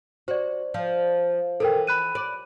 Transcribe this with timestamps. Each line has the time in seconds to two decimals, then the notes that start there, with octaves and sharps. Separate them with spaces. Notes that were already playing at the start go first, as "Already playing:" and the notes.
0.28 F#4 C5 D5
0.74 F3
1.60 E3 A4 A#4 G5
1.87 B5 F#6 D#7
2.15 D5